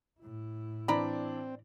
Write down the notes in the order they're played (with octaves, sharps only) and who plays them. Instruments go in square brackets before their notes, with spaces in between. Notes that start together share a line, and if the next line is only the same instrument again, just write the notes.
[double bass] A2 E4
[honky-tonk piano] E3 D4 [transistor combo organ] C4 [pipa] D5 A#5 B5